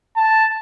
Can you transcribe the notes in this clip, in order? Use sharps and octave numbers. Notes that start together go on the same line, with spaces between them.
A5